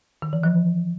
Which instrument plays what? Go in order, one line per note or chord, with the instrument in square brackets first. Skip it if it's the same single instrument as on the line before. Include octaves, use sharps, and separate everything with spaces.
[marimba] D#3
E3
F3